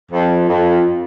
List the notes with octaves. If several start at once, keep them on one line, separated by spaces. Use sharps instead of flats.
F2
F2